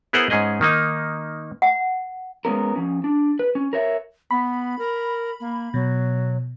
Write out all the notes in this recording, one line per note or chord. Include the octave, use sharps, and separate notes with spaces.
B3 E4 G#4 A#4 C5 F#5
G#2 C#4 G#4 D#5
D#3 A#3 D#4
F#5
G#3 B3 C#4 A#4
F3 C#4
D4
B4
C#4
A#4 C#5 E5
B3 B5
A#4
A#3
B2 F#3